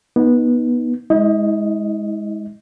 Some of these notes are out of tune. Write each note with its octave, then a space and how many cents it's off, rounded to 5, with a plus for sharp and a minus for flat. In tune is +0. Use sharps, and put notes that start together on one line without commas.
B3 -20 D#4 +0
G#3 +0 E4 -40 D#5 +0